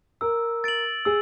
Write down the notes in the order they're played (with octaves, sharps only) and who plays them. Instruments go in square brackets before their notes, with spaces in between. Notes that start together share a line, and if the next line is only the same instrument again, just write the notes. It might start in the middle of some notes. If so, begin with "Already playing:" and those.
[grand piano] A#4 [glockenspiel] E6
[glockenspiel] A6 D7 F#7
[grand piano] G#4 [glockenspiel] E6